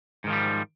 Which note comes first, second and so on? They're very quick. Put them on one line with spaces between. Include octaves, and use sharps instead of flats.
G#2 D#3 F3 G3